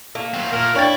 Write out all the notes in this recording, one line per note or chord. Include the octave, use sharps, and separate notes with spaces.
A3 A#3
F#3 C4
A#2 A#4
D4 E4 C#5 G5 A6